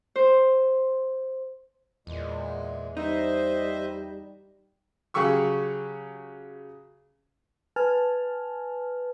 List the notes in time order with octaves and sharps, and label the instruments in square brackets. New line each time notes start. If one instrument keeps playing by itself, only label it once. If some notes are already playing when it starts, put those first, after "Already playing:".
[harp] C5
[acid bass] E2 [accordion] A#2 G#3
[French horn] G3 [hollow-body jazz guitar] D#4 [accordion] C5 D#5 E5
[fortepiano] C#3 F#3 G4 C#6 E6
[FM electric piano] B4 G#5 A5 F6